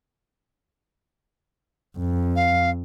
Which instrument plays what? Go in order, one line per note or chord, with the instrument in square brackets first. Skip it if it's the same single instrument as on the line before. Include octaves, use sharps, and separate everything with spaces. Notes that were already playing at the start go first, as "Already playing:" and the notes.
[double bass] F2
[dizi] F5